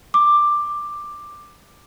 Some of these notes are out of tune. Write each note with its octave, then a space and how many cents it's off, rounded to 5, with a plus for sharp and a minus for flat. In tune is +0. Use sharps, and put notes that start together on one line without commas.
D6 +10